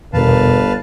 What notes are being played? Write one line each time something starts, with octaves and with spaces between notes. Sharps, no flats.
G1 E2 B2 A#4 B4 F5 A5